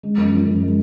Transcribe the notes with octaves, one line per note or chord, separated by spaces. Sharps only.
G#3
F#2
F3
F#2
G#3